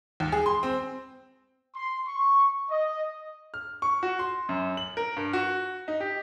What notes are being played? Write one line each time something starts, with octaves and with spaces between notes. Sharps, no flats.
D#2
G#4
C6
C4
C6
C#6
D#5
F6
C#6
F#4
C6
F#2
F#7
A#4
G2
F#4
D#4
G4